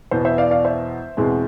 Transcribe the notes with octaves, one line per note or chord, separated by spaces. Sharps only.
E2 B2 B3 C5
C5 E5
D5 F5
D5 F5
C5 E5
E2 B2 G#3 C4